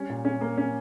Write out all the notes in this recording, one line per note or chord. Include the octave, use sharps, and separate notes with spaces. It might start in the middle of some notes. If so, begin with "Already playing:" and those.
Already playing: G3 C#4
A#2
C#4
A#3
C#4